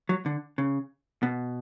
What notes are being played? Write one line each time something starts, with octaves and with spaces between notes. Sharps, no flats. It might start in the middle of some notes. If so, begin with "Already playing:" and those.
F#3
D3
C#3
B2